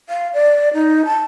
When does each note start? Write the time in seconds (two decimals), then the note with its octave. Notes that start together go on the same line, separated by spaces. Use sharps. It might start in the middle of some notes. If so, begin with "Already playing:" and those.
0.09 F5
0.34 D5
0.74 D#4
1.05 A5